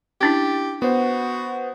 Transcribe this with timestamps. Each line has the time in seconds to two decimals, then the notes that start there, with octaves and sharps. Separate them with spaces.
0.21 C#4 D4 E4 G4
0.82 B3 F#4 C5